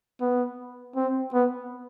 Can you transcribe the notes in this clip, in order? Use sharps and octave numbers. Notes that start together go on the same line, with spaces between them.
B3
C4
B3